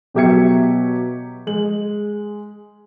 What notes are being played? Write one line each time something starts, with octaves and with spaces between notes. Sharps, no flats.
B2 F#3 G4 E5 G#6 C#7
G#3 F#7